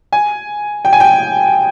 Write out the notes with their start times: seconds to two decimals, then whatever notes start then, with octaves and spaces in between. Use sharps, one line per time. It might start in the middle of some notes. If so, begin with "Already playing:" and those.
0.12 G#5
0.85 G5
0.93 G#5
1.00 G5